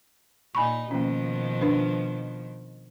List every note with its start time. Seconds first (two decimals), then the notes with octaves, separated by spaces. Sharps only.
0.55 A#2 D#4 G#5 B5 C#6
0.91 B2 D#3 F3 A#3 C#4
1.61 D4 B4